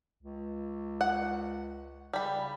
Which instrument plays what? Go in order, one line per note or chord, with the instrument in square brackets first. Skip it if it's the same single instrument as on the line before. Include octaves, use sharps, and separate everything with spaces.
[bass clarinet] C#2
[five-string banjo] F#5
[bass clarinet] C#3 [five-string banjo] G3 B5